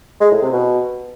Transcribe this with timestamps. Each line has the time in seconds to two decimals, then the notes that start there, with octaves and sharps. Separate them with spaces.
0.20 G#3
0.31 A2
0.42 C3
0.53 B2